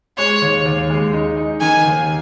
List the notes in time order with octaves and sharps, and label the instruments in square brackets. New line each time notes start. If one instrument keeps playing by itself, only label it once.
[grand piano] G#3 [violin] C#5
[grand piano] D#2
D#2
G#3
D#4
D#4
[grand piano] D#3 [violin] G#5
[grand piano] D#2